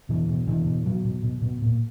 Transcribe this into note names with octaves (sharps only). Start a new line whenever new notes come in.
B2 E3
B2
B2 E3
B2
B2 F#3
B2
B2
B2
A#2